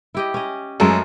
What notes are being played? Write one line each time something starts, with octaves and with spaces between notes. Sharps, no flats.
E4 G4 D#5
C#4 D#5
F#2 G#3 A3 A#4